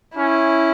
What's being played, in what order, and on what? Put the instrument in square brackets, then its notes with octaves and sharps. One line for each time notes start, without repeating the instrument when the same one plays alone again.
[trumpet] C#4 [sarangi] E4